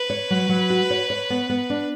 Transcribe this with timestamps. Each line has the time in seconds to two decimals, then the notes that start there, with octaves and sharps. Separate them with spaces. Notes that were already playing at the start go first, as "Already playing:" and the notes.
Already playing: B4
0.10 C#5
0.30 F#3
0.49 F#3
0.70 F#4
0.90 C#5
1.10 C#5
1.30 B3
1.50 B3
1.70 D4